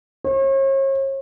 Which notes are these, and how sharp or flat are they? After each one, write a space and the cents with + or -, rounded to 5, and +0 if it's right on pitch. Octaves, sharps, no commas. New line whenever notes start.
C#5 -40